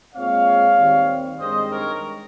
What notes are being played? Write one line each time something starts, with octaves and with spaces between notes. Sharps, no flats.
A#2 G#3 C4 C#5 F5
D#2 D#3 G3 C4
G2 D#3 G#3 C4 C5 D#5
A#4 C#5